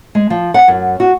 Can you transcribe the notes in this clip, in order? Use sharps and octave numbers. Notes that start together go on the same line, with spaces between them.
G#3
F3
F#5
F#2
F#4